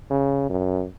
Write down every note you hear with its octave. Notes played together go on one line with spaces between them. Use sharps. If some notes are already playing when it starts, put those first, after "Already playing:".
C#3
F#2